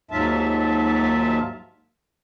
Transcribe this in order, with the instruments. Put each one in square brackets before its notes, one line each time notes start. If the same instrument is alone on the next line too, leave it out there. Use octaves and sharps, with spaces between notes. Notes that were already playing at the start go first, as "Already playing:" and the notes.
[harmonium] D#2 G#2 F#3 F4 E5 A5